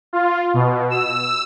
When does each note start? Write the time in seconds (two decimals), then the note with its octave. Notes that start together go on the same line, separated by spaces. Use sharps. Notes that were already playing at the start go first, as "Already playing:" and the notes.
0.13 F4
0.54 B2
0.90 E6